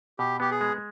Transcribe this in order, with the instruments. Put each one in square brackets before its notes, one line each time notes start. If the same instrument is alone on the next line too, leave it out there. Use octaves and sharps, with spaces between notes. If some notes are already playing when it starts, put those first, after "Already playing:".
[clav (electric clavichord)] B2 [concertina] G4
[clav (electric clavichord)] B3 [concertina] G4
[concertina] G#4
[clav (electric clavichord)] G#3